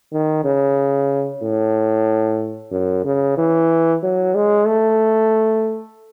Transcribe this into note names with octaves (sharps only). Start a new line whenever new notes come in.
D#3
C#3
A2
F#2
C#3
E3
F#3
G#3
A3